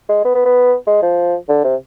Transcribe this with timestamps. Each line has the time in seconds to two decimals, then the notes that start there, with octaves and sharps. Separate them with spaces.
0.09 G#3
0.25 B3
0.35 B3
0.46 B3
0.87 G#3
1.02 F3
1.49 D3
1.64 C3